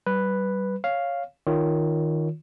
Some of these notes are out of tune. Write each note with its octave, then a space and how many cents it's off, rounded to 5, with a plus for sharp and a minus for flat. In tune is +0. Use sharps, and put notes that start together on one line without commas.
G3 -30 B4 +0
C#5 +0 F5 +0
D#3 +0 F4 +0 C#5 +15